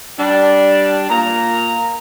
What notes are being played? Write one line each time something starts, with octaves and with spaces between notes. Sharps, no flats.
G3 D4
A#2 A#3 A#5